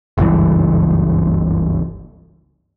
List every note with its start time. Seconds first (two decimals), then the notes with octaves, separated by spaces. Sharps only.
0.18 F#1 C#2 G2 E3